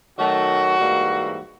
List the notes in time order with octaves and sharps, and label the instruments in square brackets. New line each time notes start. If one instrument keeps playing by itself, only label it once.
[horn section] D#3 F#3 A3 F#4
G#2 E3 G3 A#3